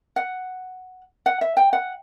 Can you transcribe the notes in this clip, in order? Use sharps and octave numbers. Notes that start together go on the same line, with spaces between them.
F#5
F#5
E5
G5
F#5